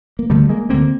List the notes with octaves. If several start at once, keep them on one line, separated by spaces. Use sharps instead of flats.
A#3
D2 D3 G3 A3
G#3 A#3
D2 D3 A#3 C4